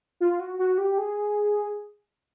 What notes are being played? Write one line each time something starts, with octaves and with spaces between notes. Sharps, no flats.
F4
F#4
F#4
G4
G#4